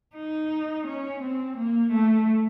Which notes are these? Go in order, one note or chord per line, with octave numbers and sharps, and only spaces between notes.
D#4
C#4
C4
A#3
A3